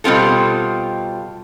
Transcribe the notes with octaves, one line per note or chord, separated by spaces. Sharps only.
B2 G3 C4 F4 A4